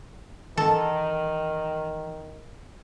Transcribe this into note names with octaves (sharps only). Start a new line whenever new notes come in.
D#3 E3 A4